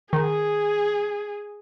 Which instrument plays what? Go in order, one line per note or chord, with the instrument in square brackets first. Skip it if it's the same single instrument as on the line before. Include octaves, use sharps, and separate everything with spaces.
[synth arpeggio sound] D#3 [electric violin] G#4